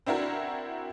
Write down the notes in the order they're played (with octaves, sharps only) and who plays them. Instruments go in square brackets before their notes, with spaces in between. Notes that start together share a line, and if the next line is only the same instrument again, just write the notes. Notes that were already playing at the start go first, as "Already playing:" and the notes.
[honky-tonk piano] C4 D4 E4 F#4 A#4